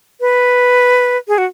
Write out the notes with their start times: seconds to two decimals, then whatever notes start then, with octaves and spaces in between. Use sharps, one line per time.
0.21 B4
1.28 G#4
1.38 F#4